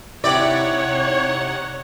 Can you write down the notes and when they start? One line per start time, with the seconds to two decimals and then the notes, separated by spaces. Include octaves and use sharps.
0.24 C3 D#4 E4 G4 C#5 D5 F#5